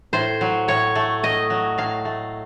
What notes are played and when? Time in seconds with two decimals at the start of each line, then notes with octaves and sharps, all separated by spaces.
0.13 A2 C5
0.41 F#3
0.68 A2 C#5
0.95 A3
1.23 A2 D#5
1.50 F#3
1.78 A2 F5
2.05 A3